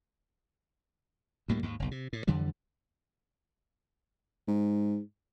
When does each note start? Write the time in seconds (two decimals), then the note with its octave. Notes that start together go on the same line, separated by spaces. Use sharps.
1.48 D2 A2 G3 A#3
1.63 D#2 G#2
1.80 F#1 B1
1.91 C3
2.13 A2
2.27 F2 D3 E3 G3
4.47 G#2